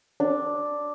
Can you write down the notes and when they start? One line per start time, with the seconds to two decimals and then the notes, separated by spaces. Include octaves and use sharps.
0.20 D4